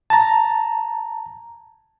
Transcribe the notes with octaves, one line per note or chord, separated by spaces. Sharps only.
A5 A#5